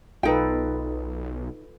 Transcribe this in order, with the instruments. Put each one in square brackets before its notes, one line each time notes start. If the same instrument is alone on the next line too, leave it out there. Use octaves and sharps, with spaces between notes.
[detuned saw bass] B1 [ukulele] D#4 G5 [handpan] F4 A4 B4